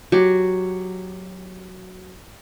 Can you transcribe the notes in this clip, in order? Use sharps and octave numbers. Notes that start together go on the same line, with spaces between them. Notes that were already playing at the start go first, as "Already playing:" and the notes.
F#3 G4